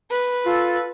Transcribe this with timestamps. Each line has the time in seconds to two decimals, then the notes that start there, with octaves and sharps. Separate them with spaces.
0.10 B4
0.45 F4 A4